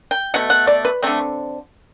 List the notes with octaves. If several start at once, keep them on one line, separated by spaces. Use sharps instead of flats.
G5
B2 A3 F#5
F#5
D5
B4
D3 A3 C4